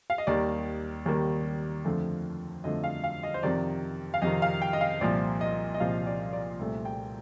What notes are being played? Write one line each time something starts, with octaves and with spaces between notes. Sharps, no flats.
F5
D#5
D#2 D#3 G3 A#3 D5
D#2 D#3 G3 A#3
F2 D3 F3 A3
F2 D3 F3 A3 D#5
F5
F5
D#5
C5
F2 C3 D#3 D5
F5
F2 C3 D#3 D#5
F5
G5
D#5
F5
C2 A#2 F3 D5
D#5
D#5
C2 A#2 F3 F5
D5
D5
C2 A#2 A3
G5